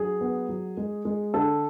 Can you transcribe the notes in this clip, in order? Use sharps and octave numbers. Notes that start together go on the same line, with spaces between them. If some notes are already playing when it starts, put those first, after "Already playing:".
Already playing: F#3 D4 G#4
B3
F#3
G#3
G#3
D3 A4